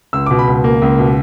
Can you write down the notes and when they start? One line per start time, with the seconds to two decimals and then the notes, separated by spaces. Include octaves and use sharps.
0.13 C#2 E6
0.26 B2 D6
0.39 B5
0.47 C#2
0.64 A#3
0.82 C#2
0.99 B2